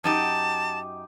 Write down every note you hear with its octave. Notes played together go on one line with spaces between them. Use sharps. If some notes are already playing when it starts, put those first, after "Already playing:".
F#2 D#4 G4 A5